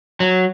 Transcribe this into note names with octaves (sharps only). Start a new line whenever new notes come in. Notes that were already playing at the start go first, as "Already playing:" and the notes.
F#3